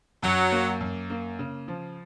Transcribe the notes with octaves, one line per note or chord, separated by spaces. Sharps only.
F#2 F#3
A#3
F#2
A#3
C#3
F3